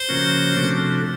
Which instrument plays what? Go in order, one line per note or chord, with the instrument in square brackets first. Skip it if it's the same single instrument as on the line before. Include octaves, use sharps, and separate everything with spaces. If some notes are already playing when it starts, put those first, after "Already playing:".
Already playing: [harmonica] C5
[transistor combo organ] C#3 F3 A#3 C#4 F#4
C3 F3 A3 D4 F#4